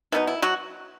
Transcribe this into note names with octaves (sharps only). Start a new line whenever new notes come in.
B2 F#3 B3 D#4 E4
E4
F#3 F#4